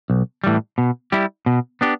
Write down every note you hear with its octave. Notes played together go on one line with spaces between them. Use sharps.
B1
A2 E3 G3
B2
G3 E4 G4
B2
B3 D4 G4